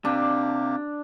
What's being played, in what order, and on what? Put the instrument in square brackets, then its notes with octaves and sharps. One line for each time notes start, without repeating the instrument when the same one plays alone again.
[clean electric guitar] C3 [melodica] A#3 G4 [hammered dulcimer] D4